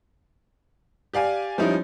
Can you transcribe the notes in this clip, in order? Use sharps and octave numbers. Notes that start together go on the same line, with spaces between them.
G4 D5 F5 G#5
F3 G3 C#4 D#4 E4